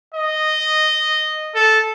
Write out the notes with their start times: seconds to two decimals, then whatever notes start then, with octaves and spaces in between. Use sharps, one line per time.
0.15 D#5
1.55 A4